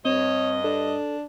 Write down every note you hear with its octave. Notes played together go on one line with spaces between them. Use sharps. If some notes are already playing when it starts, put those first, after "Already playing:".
G2 C4 C#5 D#5
D4 A4